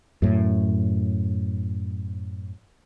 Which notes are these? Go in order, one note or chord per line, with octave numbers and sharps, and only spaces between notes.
F#2 A2